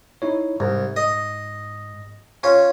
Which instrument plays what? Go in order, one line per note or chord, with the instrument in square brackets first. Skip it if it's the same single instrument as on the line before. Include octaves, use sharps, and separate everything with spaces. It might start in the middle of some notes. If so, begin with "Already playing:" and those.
[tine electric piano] D#4 E4 C#5
[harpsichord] C2 [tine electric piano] G#2
[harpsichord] D#5
C#4 F4 C#5